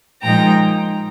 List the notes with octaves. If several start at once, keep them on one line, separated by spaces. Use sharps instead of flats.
A#2 F3 G#3 D#4 G5 A#5